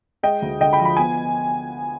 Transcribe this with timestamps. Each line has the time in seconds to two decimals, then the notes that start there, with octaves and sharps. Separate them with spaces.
0.23 G#3 D#5 G5
0.42 D2
0.60 D3 D#5 G5
0.73 G5 B5
0.80 F3
0.85 B5
0.97 B3 G#5